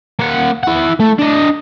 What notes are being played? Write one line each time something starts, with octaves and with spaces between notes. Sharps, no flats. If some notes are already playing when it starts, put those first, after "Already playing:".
A#3 F#5
E4 F#5
A3
D4 D#5